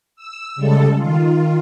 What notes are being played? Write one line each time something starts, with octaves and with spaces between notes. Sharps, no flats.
E6
C#3 G3 G#3 A4
D#3 F4